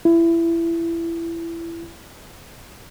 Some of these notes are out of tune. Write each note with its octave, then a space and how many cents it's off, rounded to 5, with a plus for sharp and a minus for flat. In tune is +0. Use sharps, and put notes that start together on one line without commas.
E4 +20